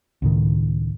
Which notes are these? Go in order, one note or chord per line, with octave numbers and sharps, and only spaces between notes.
C#2 A2 D#3